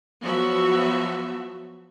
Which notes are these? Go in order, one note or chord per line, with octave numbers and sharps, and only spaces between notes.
F3 F#3 B3 F#4 E5